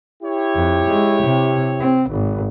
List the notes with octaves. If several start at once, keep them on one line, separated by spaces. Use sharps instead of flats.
E4 G4 C#5
F2
G#3
C3
C4
G#1